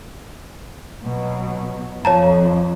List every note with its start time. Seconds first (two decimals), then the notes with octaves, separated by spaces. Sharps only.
1.02 B2 F#3
2.05 F2 C#5 A5 A#5